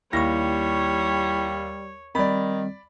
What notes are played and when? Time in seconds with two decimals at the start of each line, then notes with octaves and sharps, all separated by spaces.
0.13 D#2 G3 E4 C#5 C#6 A#6
2.15 D#3 G3 C4 D5 B5